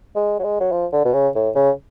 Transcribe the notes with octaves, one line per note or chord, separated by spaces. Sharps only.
G#3
F#3
G#3
F#3
F3
D3
B2
C#3
A2
C#3